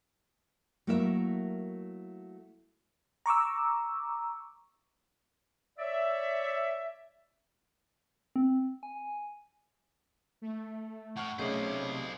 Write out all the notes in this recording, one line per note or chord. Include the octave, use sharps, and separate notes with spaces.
F#3 A3 A#3 E4 A#4 E5
A#5 C#6 D6 E6
C#5 D5 E5
C4
G#5
A3
A2 F#5 C#6 F6
B1 C3 A3 C#4 G#4 C5 D5 D#5